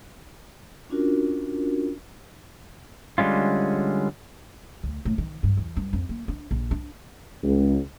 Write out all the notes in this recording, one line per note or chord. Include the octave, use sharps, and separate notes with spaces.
C#4 D4 F4 F#4 A#4
D3 G3 G#3 C#4 F4
D2
A2
D#3
G2
E2
G2
F2
A#3
D4
A#1
D4
C#2